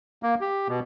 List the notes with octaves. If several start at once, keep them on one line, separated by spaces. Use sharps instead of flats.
A#3
G4
B2